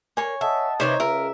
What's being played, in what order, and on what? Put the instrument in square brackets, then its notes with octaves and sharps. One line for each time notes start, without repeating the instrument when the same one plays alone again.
[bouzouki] A#3 [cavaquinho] C#5 G#5
[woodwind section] D#5 F#5 A5 [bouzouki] E5
[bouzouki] C3 D#3 E3 [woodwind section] D#4 [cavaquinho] C5 C#5
[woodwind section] C#2 [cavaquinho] A#4 [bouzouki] E5